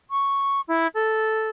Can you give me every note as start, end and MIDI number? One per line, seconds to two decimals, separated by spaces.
0.10 0.60 85
0.68 0.87 64
0.94 1.49 69